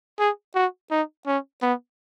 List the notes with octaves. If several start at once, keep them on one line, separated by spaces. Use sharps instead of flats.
G#4
F#4
D#4
C#4
B3